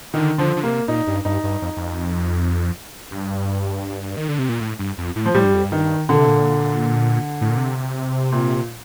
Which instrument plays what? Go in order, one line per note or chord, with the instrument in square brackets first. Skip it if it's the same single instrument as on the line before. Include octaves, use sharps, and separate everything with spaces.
[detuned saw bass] D3 [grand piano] D#3
[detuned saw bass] D3 [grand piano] F3
[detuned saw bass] D3
[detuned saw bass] C3 [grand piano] A#3
[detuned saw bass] A#2 [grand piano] D#4
[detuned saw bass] G2
[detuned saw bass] G2 [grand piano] D#4
[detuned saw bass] G2
F2
F2
G2
D#3
D3
C3
A#2
A2
G2
F2
A2
[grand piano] F3
[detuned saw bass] A2 [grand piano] G3
[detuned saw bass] G2
F2
G2
[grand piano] D#3
[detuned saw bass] A#2 [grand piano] D3
[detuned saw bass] C3
A#2
A2
A#2
C3
[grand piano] A#2